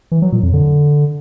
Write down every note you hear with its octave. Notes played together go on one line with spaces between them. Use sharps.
E3
F#3
A#2
F2
D3